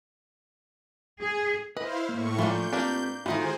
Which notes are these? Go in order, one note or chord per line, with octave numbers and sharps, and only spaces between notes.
G#4
E4 B4 C5 D#5 F5
A2 A#3 C#6
E3 F3 A3 A#3 D4 F4 G6
A#3 C4 D4 G4 B4
D#3 E3 A3 D#4 F4 F#4 G#4 C5